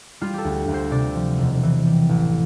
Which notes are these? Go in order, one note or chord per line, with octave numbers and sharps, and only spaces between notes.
G3 F4
G4 A4
D2
D2
C5
C3 D5
F3
E1
E3
G3
A1